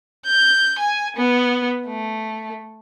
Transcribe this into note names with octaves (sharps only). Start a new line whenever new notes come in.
G6
G#5
B3
A3